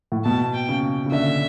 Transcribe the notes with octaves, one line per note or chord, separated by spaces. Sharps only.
A2
B2 A5
G5
C#3
C#3
D3 E5